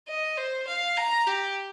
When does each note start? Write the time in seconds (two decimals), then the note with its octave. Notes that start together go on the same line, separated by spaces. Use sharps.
0.08 D#5
0.37 C5
0.67 F5
0.97 A#5
1.27 G4